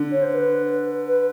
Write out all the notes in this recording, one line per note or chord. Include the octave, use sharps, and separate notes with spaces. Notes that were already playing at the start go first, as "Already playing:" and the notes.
Already playing: D3
C#5
C5
B4
B4